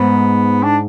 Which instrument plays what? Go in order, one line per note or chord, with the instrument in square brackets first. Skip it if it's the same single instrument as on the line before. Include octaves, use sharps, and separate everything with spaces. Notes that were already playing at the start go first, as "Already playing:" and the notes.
Already playing: [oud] G#2 [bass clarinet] B3
[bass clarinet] D4